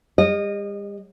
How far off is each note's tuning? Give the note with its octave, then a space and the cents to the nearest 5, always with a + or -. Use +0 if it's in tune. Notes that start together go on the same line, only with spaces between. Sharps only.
G3 +45 D#5 -20